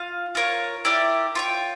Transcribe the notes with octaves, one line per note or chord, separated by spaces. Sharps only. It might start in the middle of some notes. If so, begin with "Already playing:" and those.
Already playing: F4 F5
F4 A#4 C#5
E4 G4 A#4 D5
F4 C#5 G5